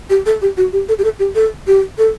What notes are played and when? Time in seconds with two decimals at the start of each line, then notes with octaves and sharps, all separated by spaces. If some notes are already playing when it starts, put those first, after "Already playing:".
0.10 G4
0.26 A4
0.42 G4
0.57 F#4
0.73 G4
0.89 A4
0.99 G4
1.04 A4
1.19 G4
1.35 A4
1.67 G4
1.98 A4